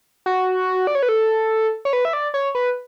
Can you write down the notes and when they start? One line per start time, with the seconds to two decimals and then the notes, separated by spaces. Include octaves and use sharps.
0.26 F#4
0.87 D5
0.95 C#5
1.03 B4
1.09 A4
1.85 C#5
1.93 B4
2.05 E5
2.13 D5
2.34 C#5
2.55 B4